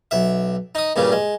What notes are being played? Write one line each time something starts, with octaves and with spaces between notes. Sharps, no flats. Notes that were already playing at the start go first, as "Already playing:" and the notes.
B1 E5
D#4 D#6
G2 A#2 C#3 G3
G#3